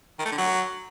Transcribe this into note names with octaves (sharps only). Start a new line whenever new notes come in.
D#3
A3
D3
F#3